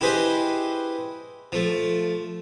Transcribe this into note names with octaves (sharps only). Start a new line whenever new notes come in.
E4 G4 G#4 B4 C5 D#5
F3 A3